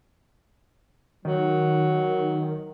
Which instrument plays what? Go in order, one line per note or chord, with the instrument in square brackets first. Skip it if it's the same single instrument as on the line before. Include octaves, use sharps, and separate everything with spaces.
[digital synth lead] D#3 [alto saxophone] F#3